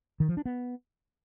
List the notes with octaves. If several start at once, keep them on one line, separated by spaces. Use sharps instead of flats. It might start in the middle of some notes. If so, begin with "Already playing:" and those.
D#3
F3
D4
B3